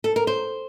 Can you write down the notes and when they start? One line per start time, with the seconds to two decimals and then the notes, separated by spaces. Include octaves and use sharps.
0.04 A4
0.16 A#4
0.27 C5